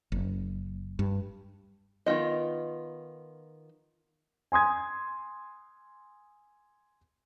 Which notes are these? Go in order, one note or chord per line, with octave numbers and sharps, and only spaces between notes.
F#1
G2
D#3 B3 F4 D#5
G#5 C6 D#6 G#6